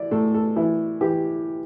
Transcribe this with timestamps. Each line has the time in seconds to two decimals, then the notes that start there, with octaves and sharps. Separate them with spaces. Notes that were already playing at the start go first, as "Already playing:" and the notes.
Already playing: E3 E4 D5
0.11 A2 A4
0.34 A4
0.56 E3 E4
1.01 E3 G4